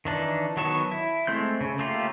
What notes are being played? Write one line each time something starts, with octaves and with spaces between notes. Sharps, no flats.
D#3 E3 D4 D#4
D#3 F#3 B3 A5 C#6
E4
G#3 A3 C4 G6
C#3
A3 A#3 C#4 F4 G4